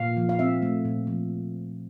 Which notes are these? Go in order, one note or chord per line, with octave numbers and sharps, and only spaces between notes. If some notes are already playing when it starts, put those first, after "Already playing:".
Already playing: A#2 F5
F3
F5
C4 E5
A3
A#2
F3